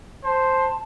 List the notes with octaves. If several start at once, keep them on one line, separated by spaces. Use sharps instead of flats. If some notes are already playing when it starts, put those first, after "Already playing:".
C5 A5